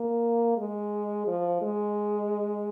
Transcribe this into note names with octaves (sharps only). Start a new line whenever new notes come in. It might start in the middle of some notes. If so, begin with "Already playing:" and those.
Already playing: A#3
G#3
F3
G#3